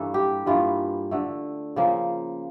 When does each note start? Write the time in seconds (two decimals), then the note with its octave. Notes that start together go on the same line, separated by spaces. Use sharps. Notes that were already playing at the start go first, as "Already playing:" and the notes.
Already playing: G2 E3 A#3 A4
0.14 G4
0.46 G2 E3 A#3 F4
1.11 D3 A3
1.76 C#3 F3 A#3